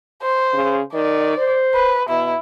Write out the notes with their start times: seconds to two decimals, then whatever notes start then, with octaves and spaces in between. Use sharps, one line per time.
0.22 C5
0.53 C#3
0.93 D#3 D5
1.37 C5
1.74 B4
2.09 B2 E4